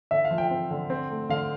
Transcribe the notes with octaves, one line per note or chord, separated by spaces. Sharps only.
D3 E5
F5
F3
G5
C4
D3
C4
A3
D3 F5